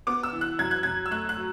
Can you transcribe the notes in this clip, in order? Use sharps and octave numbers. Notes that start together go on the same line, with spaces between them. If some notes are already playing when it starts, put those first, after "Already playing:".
B3 D6
E6
E3
F#6
F#2 G#6
F#6
F#2 G#6
E6
A3 F#6
F#6
F#3